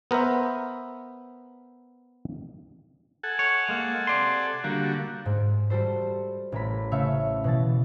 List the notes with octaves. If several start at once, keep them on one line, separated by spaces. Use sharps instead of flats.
B3 A#4 C5 E5
A4 F#5 G#5
C#5
G#3 A#3
C3 D5 C6
D3 G3 A#3 F#4
G#2
G3 F#4 A4 C5
A1 A#4 B5
C#3 A3 E5 F5 C#6 C#7
B2 E3 A6